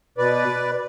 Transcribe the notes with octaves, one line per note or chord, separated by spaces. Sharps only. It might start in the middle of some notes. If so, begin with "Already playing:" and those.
B2 B4 D5